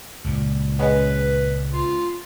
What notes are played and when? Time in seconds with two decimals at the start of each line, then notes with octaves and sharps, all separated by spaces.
0.24 C#2 A#2
0.79 G#3 B3 C#4 B4
1.73 F4